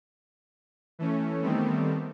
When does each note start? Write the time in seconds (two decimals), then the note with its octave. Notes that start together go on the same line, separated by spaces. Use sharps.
0.99 E3 A3 C#4
1.42 D#3 G3 A3 B3 C4